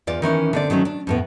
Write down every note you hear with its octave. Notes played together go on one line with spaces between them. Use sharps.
E2 F4 D5
D#3 E3 C#4 D#4
D3 C4 D5
D#3 F#3 A3 C#4
D4
F2 A2 B3